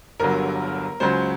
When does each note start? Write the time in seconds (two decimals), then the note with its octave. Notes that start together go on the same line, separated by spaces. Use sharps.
0.20 G1 G2 D3 F#3 A#4
1.00 C#2 C#3 F#3 C5